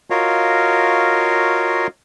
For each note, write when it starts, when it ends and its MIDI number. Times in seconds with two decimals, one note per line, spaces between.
0.10 1.87 65
0.10 1.87 66
0.10 1.87 70
0.10 1.87 73
0.10 1.87 75
0.10 1.87 77